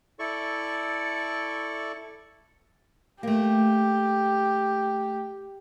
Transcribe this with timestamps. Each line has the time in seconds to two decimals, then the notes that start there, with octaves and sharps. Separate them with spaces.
0.19 E4 A4 D5 C#6
3.23 A3 A#3 G4